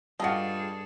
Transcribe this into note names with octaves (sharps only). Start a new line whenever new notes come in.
G2 G3 F4 F#4 G#4 A4 D#5 A5